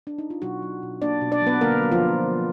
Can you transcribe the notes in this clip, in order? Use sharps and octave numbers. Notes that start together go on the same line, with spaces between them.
D4
D#4
F4
B2 F#3 F#4
F#3
B2
A#3 D4 D5
B2
D4 D5
F#3 B3 B4
D3 A#3 A#4
F#3
F3 F4